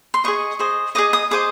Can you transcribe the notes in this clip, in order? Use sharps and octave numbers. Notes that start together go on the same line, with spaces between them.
C6
G#4 C5 D#5 C#6
G#4 C5 D#5
G#4 C5 D#5 D6
D#6
G#4 C5 D#5 D6